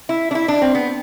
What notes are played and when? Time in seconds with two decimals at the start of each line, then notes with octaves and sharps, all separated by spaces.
0.09 E4
0.31 D4
0.35 E4
0.48 D4
0.62 C4
0.75 B3